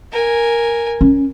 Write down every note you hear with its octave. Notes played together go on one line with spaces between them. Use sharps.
A#4 G#5
C#4